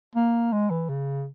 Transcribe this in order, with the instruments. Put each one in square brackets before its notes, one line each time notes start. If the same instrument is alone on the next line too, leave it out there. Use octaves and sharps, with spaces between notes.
[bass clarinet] A#3
G#3
E3
C#3